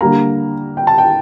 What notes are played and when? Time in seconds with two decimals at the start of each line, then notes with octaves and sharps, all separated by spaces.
0.01 D3 G3 A#3 A#5
0.77 G5
0.87 A5
0.98 G5